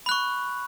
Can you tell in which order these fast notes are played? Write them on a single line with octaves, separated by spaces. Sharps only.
B5 F#6 C#6